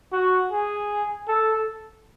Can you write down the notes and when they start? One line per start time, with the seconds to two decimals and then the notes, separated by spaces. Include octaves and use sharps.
0.12 F#4
0.51 G#4
1.28 A4